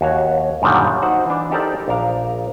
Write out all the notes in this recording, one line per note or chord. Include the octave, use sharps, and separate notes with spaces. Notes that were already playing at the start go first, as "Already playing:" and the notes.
D#2 F#4 C#5
F#2 A#2 D3 D#3 G3
D#4 F#4 C5 F#5
E3 D4
D#4 G4 A4 A#4 C5 D5
A#1 D4 A#4 F5